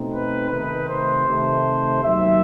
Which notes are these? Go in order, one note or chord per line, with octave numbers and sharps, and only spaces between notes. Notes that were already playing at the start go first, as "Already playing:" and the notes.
Already playing: B2 A3 C4 D#4
B4
C3 D#3 A3 D#4 B4
C5
C3 D#3 A3
D#2 D#3 F#3 E5